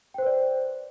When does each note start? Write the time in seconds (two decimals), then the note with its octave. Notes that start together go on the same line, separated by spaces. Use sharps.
0.14 G5
0.18 C5
0.22 B4
0.26 D5